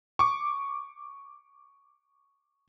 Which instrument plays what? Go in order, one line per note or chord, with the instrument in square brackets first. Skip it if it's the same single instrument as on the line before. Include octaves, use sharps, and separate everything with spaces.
[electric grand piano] C#6 D6